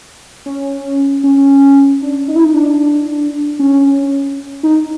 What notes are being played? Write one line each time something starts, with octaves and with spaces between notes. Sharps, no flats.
C#4
C#4
D4
D#4
E4
D#4
D4
C#4
D#4